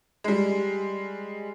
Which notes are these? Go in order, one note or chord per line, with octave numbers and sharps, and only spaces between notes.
G3 G#3